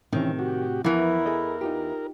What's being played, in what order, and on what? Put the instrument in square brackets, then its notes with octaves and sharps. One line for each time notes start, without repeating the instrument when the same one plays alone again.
[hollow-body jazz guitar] A2 C3 C4 [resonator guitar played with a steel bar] D#3 [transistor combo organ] E3 C#4
[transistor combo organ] F#4 G4
[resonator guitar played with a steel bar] E2 E3 [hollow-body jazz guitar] F3 B4 [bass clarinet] E4 [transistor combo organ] A#4
[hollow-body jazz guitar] G#4 A4 D#5
D#4 F4 G4